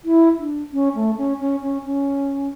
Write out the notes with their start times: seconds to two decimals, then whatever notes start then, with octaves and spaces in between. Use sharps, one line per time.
0.05 E4
0.39 D4
0.73 C#4
0.95 A3
1.17 C#4
1.40 C#4
1.62 C#4
1.85 C#4